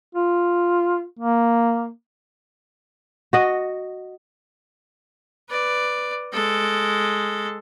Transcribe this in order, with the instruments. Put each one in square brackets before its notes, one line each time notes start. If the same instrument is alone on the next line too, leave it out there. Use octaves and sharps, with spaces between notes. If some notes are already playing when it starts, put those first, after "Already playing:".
[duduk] F4
A#3
[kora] F#4 D#5
[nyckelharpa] B4 D5
G#3 A4